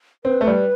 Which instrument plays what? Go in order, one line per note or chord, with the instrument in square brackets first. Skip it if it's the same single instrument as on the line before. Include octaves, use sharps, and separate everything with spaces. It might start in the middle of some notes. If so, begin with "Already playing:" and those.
[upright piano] C4 [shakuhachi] B4
[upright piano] A3
G3